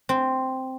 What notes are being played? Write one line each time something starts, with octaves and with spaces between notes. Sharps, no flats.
C4